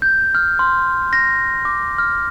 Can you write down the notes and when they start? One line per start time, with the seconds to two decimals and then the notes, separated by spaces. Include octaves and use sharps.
0.02 G6
0.35 F6
0.59 C6
1.13 A#6
1.65 D6
1.98 F6